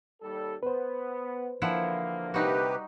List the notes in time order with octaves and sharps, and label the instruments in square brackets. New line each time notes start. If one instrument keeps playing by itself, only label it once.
[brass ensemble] D#2 G3 A4
[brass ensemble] B3 [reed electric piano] B4 C5
[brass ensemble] D3 E3 A#3 [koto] F3 E4 F#5
[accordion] C3 G4 B4 [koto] G3 D#4 F#4